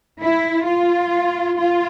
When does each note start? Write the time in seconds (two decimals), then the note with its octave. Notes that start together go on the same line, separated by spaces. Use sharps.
0.21 E4
0.66 F4
1.58 F4